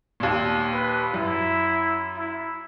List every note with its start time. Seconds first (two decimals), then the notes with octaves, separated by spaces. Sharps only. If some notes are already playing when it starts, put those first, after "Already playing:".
0.20 D#2 A#2
0.73 B4
1.14 F#2 E4
2.17 E4